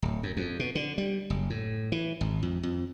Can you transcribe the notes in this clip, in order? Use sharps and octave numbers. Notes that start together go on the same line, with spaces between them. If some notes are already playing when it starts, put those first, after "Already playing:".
D1
F#2
F2
B2
D3
G3
F#1
A2
E3
G#1
F2
F2